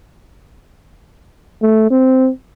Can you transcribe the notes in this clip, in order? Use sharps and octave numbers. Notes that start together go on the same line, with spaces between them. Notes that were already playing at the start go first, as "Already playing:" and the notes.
A3
C4